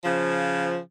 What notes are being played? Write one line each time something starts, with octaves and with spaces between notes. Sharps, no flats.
C#3 F3